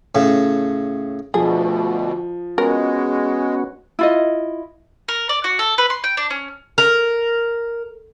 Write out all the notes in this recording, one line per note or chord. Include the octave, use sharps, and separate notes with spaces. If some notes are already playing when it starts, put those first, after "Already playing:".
A2 C#3
D2 B2 F3 G#4
G#3 B3 C#4 F#4 A#4
E4 F4 D#5
A#4
D5
F#4
A4
B4
C6
G5
D4
C#4
A#4